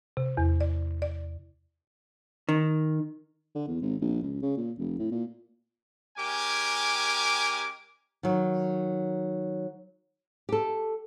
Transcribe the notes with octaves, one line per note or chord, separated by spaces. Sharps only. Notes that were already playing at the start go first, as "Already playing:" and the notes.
C3
E2
D5
D5
D#3
D3
E2
G#1
A#1
C#2
C#3
A#2
F1
A2
A#2
G#3 C#4 G4 A#4 G#5 D6
D#3 F#3
G4 A4